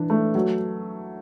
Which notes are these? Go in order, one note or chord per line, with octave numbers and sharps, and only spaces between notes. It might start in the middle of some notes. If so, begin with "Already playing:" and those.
Already playing: E3 D4
A3
F#3